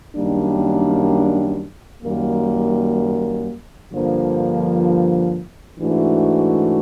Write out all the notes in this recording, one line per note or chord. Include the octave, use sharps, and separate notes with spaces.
F#2 D#3 G3 A#3 D4
F#2 D#3 G3 A#3
G2 D3 F3 A#3
G#2 E3 A3 D4 F#4